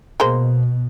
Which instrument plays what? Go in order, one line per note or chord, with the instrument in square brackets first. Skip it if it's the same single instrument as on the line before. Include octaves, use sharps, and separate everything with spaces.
[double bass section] B2 [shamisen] G#3 A#3 C5